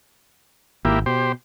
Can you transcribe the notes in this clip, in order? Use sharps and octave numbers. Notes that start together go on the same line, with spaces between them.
G#1 A#3 E4 G4
B2 G4 C5